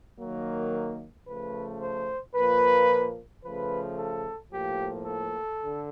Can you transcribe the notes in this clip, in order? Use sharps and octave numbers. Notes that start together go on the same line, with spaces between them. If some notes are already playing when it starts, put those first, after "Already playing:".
D#3 F#3 A#3
C#3 F3 A3 B4
C5
A#2 F3 A#3 B4
C#3 F3 A3 B4
A4
A2 F3 A#3 G4
A4
D3